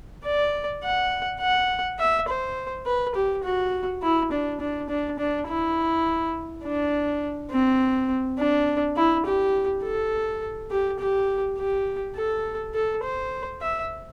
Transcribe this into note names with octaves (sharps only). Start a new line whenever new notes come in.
D5
F#5
F#5
E5
C5
B4
G4
F#4
E4
D4
D4
D4
D4
E4
D4
C4
D4
E4
G4
A4
G4
G4
G4
A4
A4
C5
E5